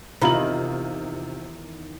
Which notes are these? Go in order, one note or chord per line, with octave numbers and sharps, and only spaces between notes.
E2 C3 D#3 D#4 F4 A#5 B5 F#7